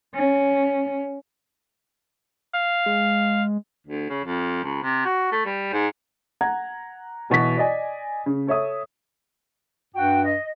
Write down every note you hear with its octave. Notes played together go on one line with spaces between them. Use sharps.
C#4
F5
G#3
D2
C#3
F2
C#2
C3
F#4
A3
G3
G#2
F#5 A#5 G#6
B1 B2 E3 B6
D5 D#5 G#5
C#3
A4 C#5 E5 D#6
G2 F#4 G5
D#5